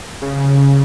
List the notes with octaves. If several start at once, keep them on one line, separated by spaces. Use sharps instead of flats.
C#3